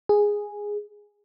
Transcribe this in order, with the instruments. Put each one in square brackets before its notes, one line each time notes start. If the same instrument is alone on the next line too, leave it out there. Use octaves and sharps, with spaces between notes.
[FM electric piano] G#4